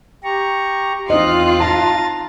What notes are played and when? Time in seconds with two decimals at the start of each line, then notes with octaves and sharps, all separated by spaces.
0.24 G4 A#5 C#6
1.10 E2 C4 D#4 F4 D#5 F#6
1.60 A5 A#5 A6